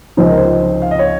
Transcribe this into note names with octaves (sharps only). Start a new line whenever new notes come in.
C#2 C3 F3 C4 D#4 C5
A#4
C5
F5
D#5
C#5